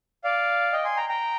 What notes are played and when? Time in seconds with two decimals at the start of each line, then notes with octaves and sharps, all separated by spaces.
0.24 D5 F5
0.73 D#5 G5
0.85 G#5 C6
0.97 G5 A#5
1.09 G5 A#5